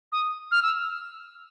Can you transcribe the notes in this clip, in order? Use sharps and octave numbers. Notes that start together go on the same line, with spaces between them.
D#6
F6
E6